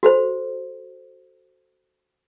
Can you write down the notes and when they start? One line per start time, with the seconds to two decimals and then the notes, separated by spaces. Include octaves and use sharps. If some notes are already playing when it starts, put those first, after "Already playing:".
0.03 F#4 A4 C5